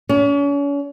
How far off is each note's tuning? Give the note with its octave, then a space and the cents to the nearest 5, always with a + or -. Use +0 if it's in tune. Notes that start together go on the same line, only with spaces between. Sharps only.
C#4 +40